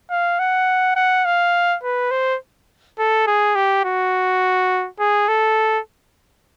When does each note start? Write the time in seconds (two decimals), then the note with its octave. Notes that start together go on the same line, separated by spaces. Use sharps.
0.10 F5
0.39 F#5
0.96 F#5
1.25 F5
1.83 B4
2.11 C5
2.99 A4
3.27 G#4
3.56 G4
3.85 F#4
5.00 G#4
5.28 A4